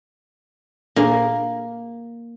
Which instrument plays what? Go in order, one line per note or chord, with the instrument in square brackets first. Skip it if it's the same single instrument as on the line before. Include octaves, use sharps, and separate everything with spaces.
[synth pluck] A#2 D4 G#4 [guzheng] A#3